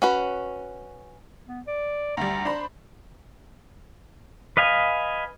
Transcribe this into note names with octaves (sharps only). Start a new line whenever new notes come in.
C#4 F#4 B4
B3
D5
D2 G3 A#5
D4 C5 B5
B4 D#5 F5 G#5